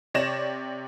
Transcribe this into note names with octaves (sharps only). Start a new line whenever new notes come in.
C3 C#5 D5 A#6 E7